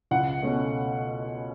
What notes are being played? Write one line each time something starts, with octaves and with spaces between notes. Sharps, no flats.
C#2 F#5
B2 A3 C#4